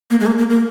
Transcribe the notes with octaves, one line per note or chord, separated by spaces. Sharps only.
A#3
G#3
A#3
A#3
A#3